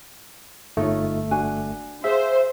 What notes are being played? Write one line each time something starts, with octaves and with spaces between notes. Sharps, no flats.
G1 A3 D#4 F4 C#5
D4 F#4 G#5
G#4 C5 E5 F5